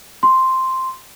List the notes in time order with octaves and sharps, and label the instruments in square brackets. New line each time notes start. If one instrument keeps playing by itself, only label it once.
[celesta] C6